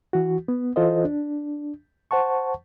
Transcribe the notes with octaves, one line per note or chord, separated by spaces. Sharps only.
E3 F#4
B3
E3 F4 A4 C5 D#5
D4
C5 F#5 A5 C#6